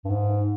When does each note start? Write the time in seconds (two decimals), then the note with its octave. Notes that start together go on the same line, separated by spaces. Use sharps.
0.05 G2
0.10 G#2